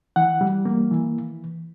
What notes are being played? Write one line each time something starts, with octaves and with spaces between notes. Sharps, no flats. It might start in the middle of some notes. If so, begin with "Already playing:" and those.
E3 F#5
G3
A#3
E3